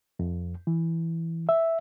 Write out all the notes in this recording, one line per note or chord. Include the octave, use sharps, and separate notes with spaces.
F2
E3
E5